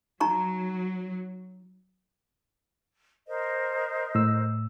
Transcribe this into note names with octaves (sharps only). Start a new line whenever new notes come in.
F#3 D#4 A#5 C#6
A#4 C5 D#5
A2 E6